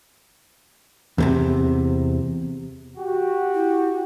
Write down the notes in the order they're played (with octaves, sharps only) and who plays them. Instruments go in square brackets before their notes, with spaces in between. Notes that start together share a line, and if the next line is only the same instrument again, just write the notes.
[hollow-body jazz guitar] E2 A2 C3
[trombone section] F#4 G4
[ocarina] E4